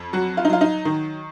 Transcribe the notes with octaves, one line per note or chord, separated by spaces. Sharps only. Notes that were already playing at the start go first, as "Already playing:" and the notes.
Already playing: F2
F#3 F#4
F4
D#4
F#3 F4
D#4
D#3